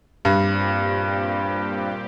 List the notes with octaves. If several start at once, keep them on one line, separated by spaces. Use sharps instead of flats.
G2 A#2 G3 C4 G4